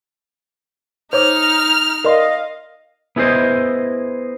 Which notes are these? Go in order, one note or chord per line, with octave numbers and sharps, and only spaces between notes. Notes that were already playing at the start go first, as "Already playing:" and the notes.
D#4 C5 C#5 D6 F6
A#4 D5 D#5 F5 C6
B3 E4 G#4 A#4 C5 D#5